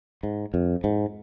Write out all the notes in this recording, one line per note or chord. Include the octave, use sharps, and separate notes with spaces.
G#2
F2
G#2